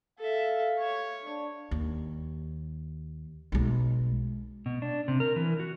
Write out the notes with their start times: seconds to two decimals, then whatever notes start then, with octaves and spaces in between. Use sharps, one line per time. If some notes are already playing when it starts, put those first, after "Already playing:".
0.19 A4 E5 F5
0.80 C#5
1.24 D4
1.71 D#2
3.52 B1 G#3
4.66 B2
4.82 D4
5.08 C3
5.20 A#4
5.36 E3
5.60 F#4